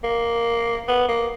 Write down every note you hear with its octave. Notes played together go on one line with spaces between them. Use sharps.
A#3
B3
A#3